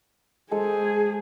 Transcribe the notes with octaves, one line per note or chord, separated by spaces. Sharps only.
G#3 G#4 A4 C5